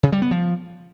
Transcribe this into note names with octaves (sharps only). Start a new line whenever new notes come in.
C#3
G3
B3
F3